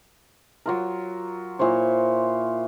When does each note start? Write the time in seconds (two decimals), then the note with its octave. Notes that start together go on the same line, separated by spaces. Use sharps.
0.66 F#3 F4 A#4
1.59 A#2 E4 C5 C#5